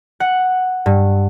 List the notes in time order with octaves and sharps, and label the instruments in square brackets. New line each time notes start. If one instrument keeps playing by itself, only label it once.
[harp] F#5
G2